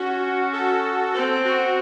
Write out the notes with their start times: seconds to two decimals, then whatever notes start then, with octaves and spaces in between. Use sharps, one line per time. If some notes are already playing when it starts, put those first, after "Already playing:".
Already playing: C#4 F#4
0.53 A4
1.14 C4 A4
1.45 F#4